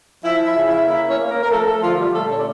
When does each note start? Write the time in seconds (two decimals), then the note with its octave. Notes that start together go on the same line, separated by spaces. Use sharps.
0.24 F3 E4 E5
0.45 E4 E5
0.55 C#3
0.67 E4 E5
0.87 A#3 E4 E5
1.09 C#4 C#5
1.19 A#3
1.30 A#3 A#4
1.42 A#4
1.51 F3 A3 A4
1.66 A3 A4
1.82 D3 F3 F4
1.99 G3 G4
2.14 A#2 A3 A4
2.29 C#4 C#5
2.38 D5